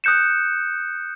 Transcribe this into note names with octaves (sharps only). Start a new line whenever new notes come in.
D#6 F#6 G6 C#7 E7